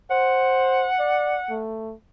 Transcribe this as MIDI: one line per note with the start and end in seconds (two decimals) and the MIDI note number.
0.11 0.88 72
0.11 1.61 78
0.99 1.38 74
1.50 1.94 57